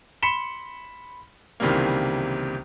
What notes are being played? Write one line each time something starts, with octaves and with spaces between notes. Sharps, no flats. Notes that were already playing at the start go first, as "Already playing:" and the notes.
B5 C6 B6 C#7 E7 G7
C#2 C3 D#3 E3 G3 A#3